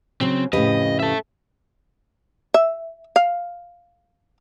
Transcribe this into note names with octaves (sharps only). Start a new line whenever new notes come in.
C#3 F#3 C4
F2 A2 C#3 G4 B4 D#5
A4 E5
E5
F5